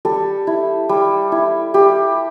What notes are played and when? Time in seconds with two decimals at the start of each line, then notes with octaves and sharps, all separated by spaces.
0.05 G3 A4
0.47 E4
0.89 G3
1.32 E4
1.74 G3 G4